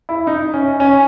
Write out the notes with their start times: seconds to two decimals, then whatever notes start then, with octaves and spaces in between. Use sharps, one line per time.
0.09 E4
0.27 D#4
0.54 C#4
0.80 C#4